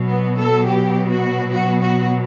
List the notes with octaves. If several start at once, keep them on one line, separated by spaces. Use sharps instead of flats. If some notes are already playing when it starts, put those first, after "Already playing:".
Already playing: B2 F#3
B3
A4
G4
F#4
F#4
F#4